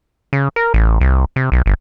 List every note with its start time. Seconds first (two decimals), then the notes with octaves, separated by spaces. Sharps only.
0.33 C#3
0.56 A#4
0.74 A1
1.01 C2
1.36 C3
1.52 B1
1.66 G1